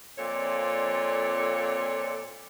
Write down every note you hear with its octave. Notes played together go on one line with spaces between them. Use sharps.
F2 A#2 C4 A4 C#5 D5